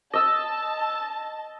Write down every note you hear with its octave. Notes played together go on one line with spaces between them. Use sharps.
D#5 A5 E6